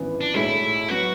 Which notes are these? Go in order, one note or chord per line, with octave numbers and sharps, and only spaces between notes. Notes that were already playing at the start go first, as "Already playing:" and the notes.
Already playing: G#1 F#2 E3 B3
D4
B1 A2 G#3 D4 E4
F#3 B3 F#4